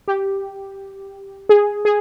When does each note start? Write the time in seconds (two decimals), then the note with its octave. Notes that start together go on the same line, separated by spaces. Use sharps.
0.08 G4
1.49 G#4
1.85 G#4